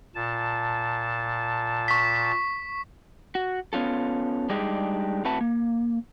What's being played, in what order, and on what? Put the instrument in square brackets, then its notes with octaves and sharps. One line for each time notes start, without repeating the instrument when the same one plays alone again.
[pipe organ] A#2 A5
[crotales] C#6 B6
[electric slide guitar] F#4
B3 C#4 F4 A4
G3 G#3 D4 D#4 G4 G#4
A2 C4 F#4 B4 E5 A5
A#3